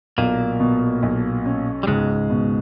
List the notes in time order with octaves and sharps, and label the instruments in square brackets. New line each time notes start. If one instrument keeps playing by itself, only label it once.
[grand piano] B1 [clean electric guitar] A#2 A#3
[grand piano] B2
B1
C#4
[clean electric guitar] G3
[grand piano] C#2 [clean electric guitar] G#2 G#3
[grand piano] B2